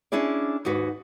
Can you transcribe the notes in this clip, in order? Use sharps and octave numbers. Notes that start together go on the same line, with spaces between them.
C#4 D4 E4 G#4 D5
D#2 G#2 F#4 B4